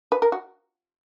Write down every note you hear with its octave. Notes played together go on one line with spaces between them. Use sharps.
B4
A#4
F#4